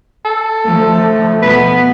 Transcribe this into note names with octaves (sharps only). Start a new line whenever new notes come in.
A4
F3 A3
B2 B3 B4